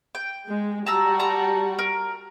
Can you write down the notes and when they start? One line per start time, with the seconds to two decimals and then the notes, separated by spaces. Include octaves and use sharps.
0.15 G5
0.47 G#3
0.87 G3 F#4 A5 A#5 E6
1.19 A5 A#5
1.79 A#4